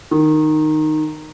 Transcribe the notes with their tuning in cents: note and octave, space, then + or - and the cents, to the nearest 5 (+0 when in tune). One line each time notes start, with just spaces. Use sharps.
D#3 -10